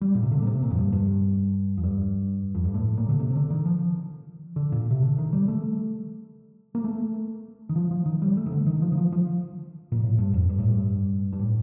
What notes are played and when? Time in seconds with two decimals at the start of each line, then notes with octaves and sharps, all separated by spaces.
0.01 G3
0.15 A#2
0.23 C3
0.32 D3
0.42 A#2
0.47 C3
0.63 A#2
0.71 F2
0.77 G2
0.93 G2
1.77 F2
1.84 G2
2.55 F2
2.64 G2
2.74 A2
2.97 A#2
3.09 D3
3.20 C3
3.30 C3
3.35 D3
3.50 D#3
3.66 F3
4.56 D3
4.72 A#2
4.91 C3
5.02 D3
5.18 D#3
5.33 G3
5.48 A3
6.75 A#3
6.84 A3
7.69 D#3
7.76 F3
7.91 F3
8.06 D#3
8.22 G3
8.37 A3
8.46 D#3
8.52 D3
8.67 D#3
8.82 F3
8.92 D#3
8.97 F3
9.12 F3
9.92 A#2
10.03 A2
10.18 G2
10.34 F2
10.49 G2
10.59 A2
10.68 G2
11.33 G2
11.39 A2